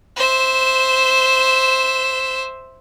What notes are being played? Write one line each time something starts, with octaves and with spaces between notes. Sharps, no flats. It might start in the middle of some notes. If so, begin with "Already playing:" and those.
C5 E5